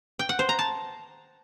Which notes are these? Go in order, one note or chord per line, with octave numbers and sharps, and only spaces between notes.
G5
F#5
C5
A#5
A5